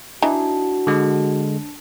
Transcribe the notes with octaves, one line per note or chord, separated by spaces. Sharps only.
E3 D4 D#4 F#4
D3 G#3